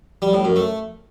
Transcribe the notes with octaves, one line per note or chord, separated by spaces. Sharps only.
G3
A2
F#2
A3